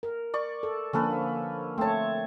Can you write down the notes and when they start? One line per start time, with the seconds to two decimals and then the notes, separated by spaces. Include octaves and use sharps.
0.03 A#4
0.34 D5 C#6
0.63 A4
0.93 D3 F3 A#3 C#4 A4 B4
1.78 A3 C4 C#5 A5